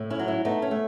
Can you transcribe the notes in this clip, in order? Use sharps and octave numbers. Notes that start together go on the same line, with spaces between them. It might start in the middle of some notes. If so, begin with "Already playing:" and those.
Already playing: A2
C#4 E4
F#3
C#4 E4
A3 B3 D#4
C#4
A3